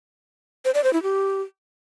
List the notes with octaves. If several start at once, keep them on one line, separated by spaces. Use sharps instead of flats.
C5
D5
C5
E4
G4